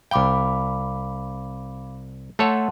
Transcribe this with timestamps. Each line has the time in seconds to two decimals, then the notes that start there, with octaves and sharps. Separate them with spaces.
0.11 C2 F5 G5 B5 D6
2.39 A3 A4 C#5 F#5 A5 C6